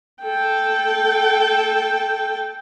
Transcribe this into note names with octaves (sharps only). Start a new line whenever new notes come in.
A4 G5